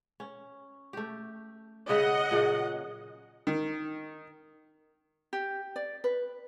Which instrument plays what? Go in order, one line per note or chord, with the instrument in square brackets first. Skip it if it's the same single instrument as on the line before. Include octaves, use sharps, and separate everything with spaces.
[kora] C#4
A3 G4
[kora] C#3 G3 E5 [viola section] D#5 F#5
[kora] A#2 C#3 F#3
[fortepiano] D#3
[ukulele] G4
D5
B4